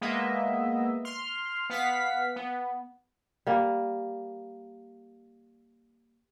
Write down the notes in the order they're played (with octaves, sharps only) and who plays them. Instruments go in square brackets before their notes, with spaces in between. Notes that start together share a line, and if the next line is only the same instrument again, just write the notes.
[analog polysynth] G#3 A#3 B3 B4 D#5 E5
C6 F6
B3 F5 F#5 B6
B3
[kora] G3 A#3